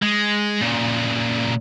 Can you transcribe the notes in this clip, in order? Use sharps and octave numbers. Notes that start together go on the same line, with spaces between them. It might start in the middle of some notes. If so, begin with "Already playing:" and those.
G#3
A#2 C#3